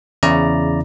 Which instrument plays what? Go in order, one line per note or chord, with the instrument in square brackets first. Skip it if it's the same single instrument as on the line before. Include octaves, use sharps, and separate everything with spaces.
[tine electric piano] E2 C#3 E4 D5 A#5